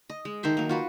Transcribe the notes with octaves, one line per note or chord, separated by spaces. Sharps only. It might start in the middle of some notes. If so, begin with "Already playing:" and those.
D#5
G#3
D#3 A4 C5 E5
F#3 A#3
F4 F#4 B4